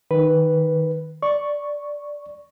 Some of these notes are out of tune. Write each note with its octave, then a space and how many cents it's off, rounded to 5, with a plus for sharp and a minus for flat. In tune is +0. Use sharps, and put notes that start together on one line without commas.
D#3 +0 B4 +0
D5 -5 C#6 +0